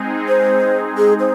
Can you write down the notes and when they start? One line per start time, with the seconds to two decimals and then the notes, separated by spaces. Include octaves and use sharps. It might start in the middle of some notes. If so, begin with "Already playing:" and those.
Already playing: G#3 C4 D#4 G#4
0.28 C5
0.98 G#4
1.20 C5